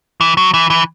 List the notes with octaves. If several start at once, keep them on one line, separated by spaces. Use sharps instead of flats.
E3
F#3
E3
E3